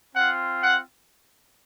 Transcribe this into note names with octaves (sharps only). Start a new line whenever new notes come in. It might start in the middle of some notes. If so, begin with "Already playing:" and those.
C4 F4 F#5
F#5